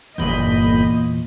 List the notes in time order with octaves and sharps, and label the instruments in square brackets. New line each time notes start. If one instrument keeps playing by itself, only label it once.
[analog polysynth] G1 B5 G6 [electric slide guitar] E2 A#2 [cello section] A#3 D#5